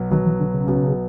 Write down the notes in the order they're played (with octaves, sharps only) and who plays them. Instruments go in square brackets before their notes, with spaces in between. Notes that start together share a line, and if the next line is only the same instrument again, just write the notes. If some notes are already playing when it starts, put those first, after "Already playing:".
Already playing: [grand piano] B1 B2 F#3
[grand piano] B1 B2 F#3 [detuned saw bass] D#3
[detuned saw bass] E3
D3
C#3
[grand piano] B1 B2 F#3